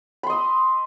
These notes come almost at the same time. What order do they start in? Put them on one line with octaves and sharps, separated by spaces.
B5 C6 D#5 E6